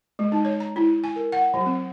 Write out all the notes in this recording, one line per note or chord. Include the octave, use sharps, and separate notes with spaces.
G#3
D#4
C#5
A#5
E4
G#5
A#4
F#5
F#3
C4